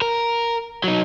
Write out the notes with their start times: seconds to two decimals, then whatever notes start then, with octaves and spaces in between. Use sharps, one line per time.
0.02 A#4
0.84 F#3 D#4